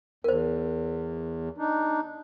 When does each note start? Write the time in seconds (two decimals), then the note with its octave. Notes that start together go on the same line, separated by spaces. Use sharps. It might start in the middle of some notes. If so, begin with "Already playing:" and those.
0.24 E2 A#4 C5
1.58 D4 D#4